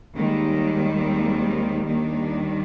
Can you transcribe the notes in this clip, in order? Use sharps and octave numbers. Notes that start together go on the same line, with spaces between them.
D#2 D#3 G3 G#3
G#3 C4
D#2 D#3 G3 A#3 D4